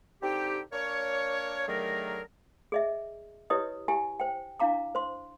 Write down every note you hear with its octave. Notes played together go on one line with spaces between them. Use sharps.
D3 C4 D#4 G4
A#3 D4 A#4 C#5
D3 D#3 F#3 A3 G#4 A#4
G#4 D#5 E5
E4 G4 B4 C#5 D#5 D#6
E4 G4 G#5
C5 G5
D4 E4 F5 A#5 D6
C5 C6